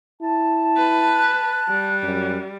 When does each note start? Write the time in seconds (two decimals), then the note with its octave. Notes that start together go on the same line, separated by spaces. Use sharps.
0.22 E4 A5
0.77 B4
1.15 F#6
1.69 G3
2.03 F#2